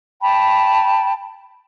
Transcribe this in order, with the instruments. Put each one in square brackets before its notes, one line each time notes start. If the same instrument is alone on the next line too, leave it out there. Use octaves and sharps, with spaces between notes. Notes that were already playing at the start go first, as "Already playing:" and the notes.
[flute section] G5 A5 B5